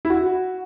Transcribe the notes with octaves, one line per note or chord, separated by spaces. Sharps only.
E4
F#4